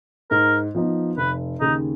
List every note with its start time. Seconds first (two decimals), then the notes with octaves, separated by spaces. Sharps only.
0.31 G#2 A#4
0.75 F3 B3 D#4
1.18 F1 B4
1.61 D#2 C#3 D#4